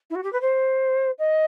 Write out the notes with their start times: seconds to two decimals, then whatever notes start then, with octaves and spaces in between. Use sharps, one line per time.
0.10 E4
0.15 F#4
0.24 G4
0.33 B4
0.41 C5
1.19 D#5